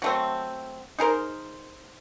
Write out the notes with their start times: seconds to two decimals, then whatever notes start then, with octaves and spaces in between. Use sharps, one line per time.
0.02 F#3 A3 C4
0.99 D#4 G#4 A#4 C5